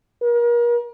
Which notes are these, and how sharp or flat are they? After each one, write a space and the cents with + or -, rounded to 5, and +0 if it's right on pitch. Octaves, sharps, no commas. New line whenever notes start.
A#4 +35